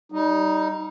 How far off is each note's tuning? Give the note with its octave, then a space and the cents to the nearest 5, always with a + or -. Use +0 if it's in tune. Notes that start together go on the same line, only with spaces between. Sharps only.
G3 -25 D#4 +0